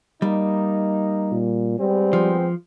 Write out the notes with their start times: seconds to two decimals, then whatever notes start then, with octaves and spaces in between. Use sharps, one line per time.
0.22 G3 A#3 D#4
1.32 A#2
1.79 G3 G#3 B3 C4
2.13 F3